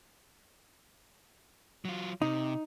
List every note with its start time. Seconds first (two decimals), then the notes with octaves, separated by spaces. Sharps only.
1.85 F#3 F4
2.22 C3 D#4